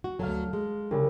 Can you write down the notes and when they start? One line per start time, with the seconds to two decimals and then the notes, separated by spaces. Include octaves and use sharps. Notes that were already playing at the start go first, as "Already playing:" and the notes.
0.04 F#4
0.19 D2 G#2 F#3 A4 F5
0.53 G#3
0.91 C2 C#3